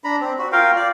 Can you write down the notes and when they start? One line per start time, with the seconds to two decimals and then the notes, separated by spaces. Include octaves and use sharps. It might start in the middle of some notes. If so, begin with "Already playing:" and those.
0.04 D4 A#5 B5
0.20 C4
0.39 F#4
0.52 F4 A#4 F5 G5
0.76 D5